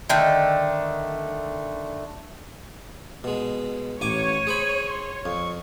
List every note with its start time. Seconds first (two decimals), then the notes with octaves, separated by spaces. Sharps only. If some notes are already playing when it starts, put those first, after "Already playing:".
0.09 D3 D#3 A3
3.24 B2 G#3
4.01 A1 C#5 G#5 D6 D#7
4.47 G#4 C5 B5
4.89 C6
5.25 F2 C#6